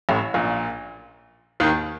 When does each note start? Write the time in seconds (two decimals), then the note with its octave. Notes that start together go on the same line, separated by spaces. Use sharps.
0.09 A1 A2
0.34 A#1 A#2
1.60 D#2 D#3